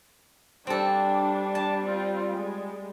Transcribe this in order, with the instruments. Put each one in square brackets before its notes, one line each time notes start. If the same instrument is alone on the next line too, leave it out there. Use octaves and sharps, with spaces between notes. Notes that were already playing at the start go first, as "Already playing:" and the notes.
[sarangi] G3 [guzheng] C4 A4 [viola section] D4
[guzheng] A5
[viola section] C4 F4
G#3